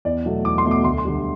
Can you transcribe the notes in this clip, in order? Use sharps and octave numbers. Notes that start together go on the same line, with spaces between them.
E2 D5
B2 F#3 A3
E2 D6
C6
B2 F#3 A3
D6
D2 C6
C6
D3 G3